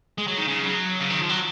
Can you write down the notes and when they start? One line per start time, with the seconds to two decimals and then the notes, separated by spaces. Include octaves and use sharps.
0.18 G#3
0.28 F#3
0.38 D#3
0.48 C#3
0.63 F#3
1.00 C#3
1.10 D#3
1.19 F3
1.29 F#3